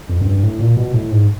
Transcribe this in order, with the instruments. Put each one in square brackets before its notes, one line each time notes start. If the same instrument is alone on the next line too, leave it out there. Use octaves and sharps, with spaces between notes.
[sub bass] F2
F#2
G2
A2
A#2
B2
A2
G#2